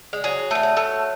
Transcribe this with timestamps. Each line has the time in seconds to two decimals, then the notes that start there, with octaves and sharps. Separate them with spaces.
0.13 G#3
0.24 F#3 G#4
0.51 E3 A3
0.63 F#3
0.77 A3